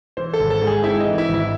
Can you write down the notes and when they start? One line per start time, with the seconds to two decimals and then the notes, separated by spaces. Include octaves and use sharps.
0.17 E3 C5
0.33 A4
0.40 G#1
0.50 A4
0.61 G#2
0.67 G#4
0.84 C4 E4
1.00 D#4
1.06 E3
1.18 E4
1.29 G#1
1.34 E4